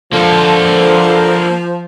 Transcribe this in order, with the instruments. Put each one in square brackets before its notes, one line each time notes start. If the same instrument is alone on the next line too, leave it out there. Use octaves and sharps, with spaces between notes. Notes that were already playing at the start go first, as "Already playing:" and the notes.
[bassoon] D3 [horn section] F3 [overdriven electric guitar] A#3 A4